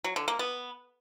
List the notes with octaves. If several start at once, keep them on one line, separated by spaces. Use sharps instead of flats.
F#3
D3
A#3
B3